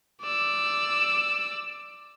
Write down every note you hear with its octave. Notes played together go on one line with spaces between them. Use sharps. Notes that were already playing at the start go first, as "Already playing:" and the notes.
D5 E6